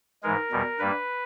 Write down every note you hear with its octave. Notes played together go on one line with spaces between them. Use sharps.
G#2 E3 G#3 A#4
E2 B2 G3
G2 G3 A#3 B4